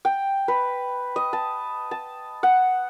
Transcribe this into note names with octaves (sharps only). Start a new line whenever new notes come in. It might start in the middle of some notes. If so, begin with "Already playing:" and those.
G5
B4
D#5
A5
A5
F#5